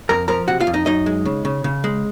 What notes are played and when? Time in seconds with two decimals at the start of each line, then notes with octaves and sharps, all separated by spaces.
0.09 F2 A#4 A#5
0.28 F3 A#4 A#5
0.48 C3 F#4 F#5
0.60 F4 F5
0.67 F2
0.74 D#4 D#5
0.86 F#2 D#4 D#5
1.06 G#3
1.25 C#3
1.45 C#3
1.64 C#3
1.84 G#3